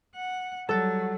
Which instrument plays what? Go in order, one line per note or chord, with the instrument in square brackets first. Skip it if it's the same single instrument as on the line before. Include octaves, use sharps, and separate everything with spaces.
[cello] F#5
[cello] F#3 [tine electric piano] G3 F#5 A6 [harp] A4